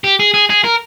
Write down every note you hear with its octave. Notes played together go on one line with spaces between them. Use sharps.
G4
G#4
G#4
G#4
A#4